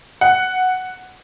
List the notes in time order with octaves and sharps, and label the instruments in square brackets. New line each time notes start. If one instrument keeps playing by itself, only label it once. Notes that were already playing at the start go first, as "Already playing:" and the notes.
[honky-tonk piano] F#5